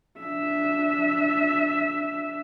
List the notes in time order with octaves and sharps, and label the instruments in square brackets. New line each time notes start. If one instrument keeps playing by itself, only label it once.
[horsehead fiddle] D4 E5